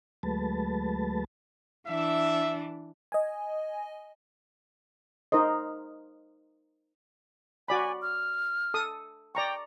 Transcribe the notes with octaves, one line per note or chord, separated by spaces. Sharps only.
D2 F#3 G#3 A3 B4 A5
E3 D4 E5
D#5 G#5
D#4 A#4 C5 D#5
F#4 D5 G#5 B5
F6
A4 D#6
D5 G5 A#5 C#6